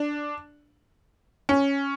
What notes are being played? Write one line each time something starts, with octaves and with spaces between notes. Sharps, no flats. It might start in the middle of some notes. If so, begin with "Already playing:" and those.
Already playing: D4
C#4